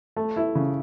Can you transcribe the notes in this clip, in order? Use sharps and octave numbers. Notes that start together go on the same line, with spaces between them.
A3
E4
C#3